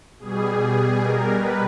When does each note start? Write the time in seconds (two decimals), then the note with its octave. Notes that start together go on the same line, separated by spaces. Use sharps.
0.19 B2 G3 G#4
1.04 A#4
1.32 B4